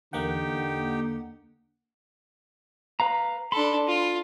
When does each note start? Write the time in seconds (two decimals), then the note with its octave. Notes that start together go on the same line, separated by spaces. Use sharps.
0.13 E2 D3 A#3 D#4 G4 F#5 G5
3.00 B4 F5 A#5
3.52 D4 A4 B5 C6
3.88 F4